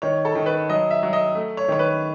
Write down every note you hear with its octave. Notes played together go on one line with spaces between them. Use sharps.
D#3 C#5
A4
D#3
B4
F#3 D#5
E5
F#3
D#5
A3
C#5
D#3 C#5
B4